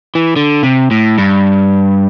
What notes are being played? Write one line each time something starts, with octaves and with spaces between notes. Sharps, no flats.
E3
D3
C3
A2
G2